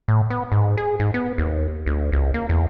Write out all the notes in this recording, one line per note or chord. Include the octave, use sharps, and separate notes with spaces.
A2
B3
G#2
G#4
G#2
B3
D#2
D2
C#2
A#3
E2